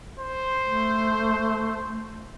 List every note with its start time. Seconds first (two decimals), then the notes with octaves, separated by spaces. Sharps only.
0.20 C5
0.64 A3